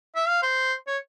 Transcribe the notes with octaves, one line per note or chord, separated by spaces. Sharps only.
E5
F5
C5
C#5